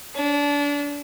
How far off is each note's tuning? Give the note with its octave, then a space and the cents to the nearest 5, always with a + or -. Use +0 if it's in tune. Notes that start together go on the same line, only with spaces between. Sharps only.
D4 -30